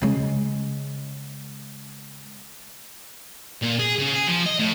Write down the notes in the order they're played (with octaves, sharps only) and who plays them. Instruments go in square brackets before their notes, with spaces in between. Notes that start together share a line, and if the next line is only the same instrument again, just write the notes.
[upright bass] C#3 G#3
[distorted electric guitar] A#2
G#4
C#3
G#4
F3
D#5
A2